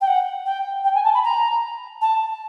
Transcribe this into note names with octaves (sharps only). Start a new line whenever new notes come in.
G5
F#5
G5
G5
G#5
A5
B5
A#5
A5